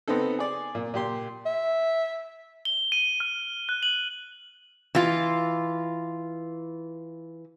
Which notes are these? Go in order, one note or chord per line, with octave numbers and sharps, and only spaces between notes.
B3 C4 D#4 A4
G#4 D5
A#2
A#2 G4 C6
E5
G7
D#7
F6
F#6
F#7
E3 F4